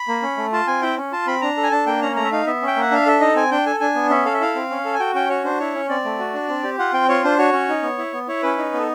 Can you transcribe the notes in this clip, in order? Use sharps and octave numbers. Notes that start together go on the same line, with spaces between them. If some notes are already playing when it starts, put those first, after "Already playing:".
Already playing: B5
A#3
C#4
A3
F4 A5
C4 G#5
E4 G5
C#4
F4 A5
C4 B5
D4 A#5
A4
G#5
D4 A5
A#3 G5
C#4 A#5
A3 A#5
E5
D#4 F5
B3 E5
C#4
G5
A#3 F#5
D4 F5
A4 E5
D#4 D#5
C4 G#5
D4 G5
A4 G#5
D4 G#5
B3
C#4 E5
A4 F5
E5
E4 F5
C4
C#4
A4
G#5
F#4 G5
C#4 G5
F#4 C#5
D4 C5
E4 C#5
C#4
C4 D5
A3
F#4
D4
C4
G4
F4 F#5
C4 G5
F4 C#5
D4 C5
F#4 C#5
C#4
D#4
B3
E4
B3
E4 C#5
C#4 B4
D#4
B3 A4